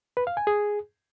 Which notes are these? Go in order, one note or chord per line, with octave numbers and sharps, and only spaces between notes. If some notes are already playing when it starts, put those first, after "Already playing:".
B4
F5
G#5
G#4